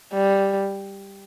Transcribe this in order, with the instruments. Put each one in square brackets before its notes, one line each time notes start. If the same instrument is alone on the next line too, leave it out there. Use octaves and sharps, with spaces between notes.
[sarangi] G3